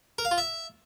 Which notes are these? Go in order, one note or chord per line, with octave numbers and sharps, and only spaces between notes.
A#4
F5
F4
E5